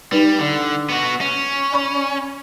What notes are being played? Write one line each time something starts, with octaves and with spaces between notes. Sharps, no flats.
G3 D#4 B4
D3
B3 F#4
C#4
D5 B5 C#6